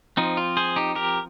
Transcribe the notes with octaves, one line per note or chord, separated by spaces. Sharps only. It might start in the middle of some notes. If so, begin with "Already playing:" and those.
F3 C4 D#4
F4
G#4 C5
D#4 G4
G4 A#4